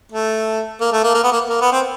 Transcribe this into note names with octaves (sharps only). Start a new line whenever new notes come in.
A3
A#3
A3
A#3
A#3
B3
A#3
A#3
B3
C4